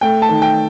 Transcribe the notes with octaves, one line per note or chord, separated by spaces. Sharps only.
A3 G5
A5
D#3
G5